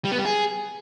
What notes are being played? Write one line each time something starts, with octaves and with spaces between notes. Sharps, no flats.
G3
B3
G3
G#4